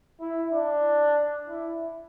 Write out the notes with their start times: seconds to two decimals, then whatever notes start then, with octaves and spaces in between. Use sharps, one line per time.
0.20 E4
0.52 D4
1.48 E4